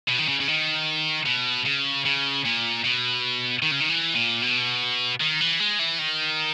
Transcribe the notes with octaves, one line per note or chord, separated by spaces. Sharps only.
B2
D#3
C#3
C#3
D#3
B2
C#3
C#3
A#2
B2
D#3
C#3
D#3
E3
A#2
B2
D#3
E3
G#3
E3
D#3